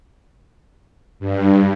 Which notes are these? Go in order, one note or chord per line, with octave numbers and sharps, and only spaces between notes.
G2